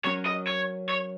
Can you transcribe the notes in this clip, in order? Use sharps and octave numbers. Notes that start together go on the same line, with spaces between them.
F#3 C#4 A#4 C#5
D#5
C#5
C#5